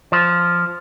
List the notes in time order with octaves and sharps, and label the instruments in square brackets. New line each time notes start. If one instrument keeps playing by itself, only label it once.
[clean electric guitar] F3